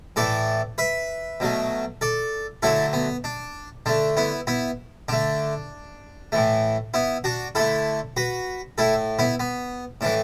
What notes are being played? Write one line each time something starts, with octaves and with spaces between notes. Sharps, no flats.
A2 E3 A3 A4 D5
B4 E5
B2 F#3 A3
A4 D5
D3 F#3 A3 E4 A4
B3
D4
D3 A3 D4
B3 E4
B3 E4
D3 A3 D4
A2 E3 A3
B3 E4
D4 F#4
D3 A3 E4 A4
F#4 B4
A2 A3 E4 A4
B3 E4
B3
A2 E3 A3 D4